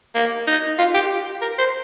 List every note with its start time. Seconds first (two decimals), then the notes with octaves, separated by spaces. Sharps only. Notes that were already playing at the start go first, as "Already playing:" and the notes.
0.15 A#3
0.47 D#4
0.79 F4
0.94 G4
1.41 A#4
1.58 C5